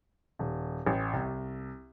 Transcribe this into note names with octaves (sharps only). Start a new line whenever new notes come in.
D#1
A1
C2